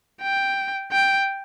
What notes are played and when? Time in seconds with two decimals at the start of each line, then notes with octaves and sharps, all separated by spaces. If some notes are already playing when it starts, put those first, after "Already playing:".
0.22 G5
0.92 G5